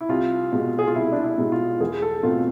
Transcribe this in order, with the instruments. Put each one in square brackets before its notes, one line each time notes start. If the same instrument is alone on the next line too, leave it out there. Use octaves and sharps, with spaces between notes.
[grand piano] E4
[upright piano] C2 [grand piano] F4
[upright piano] B2 G#3
[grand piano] G#4
F4
[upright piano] C2 [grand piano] E4
[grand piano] D4
E4
[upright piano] B2 G#3
[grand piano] F4
[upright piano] E2 [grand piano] G#4
[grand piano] A4
[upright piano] B2 A3 C4 [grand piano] F4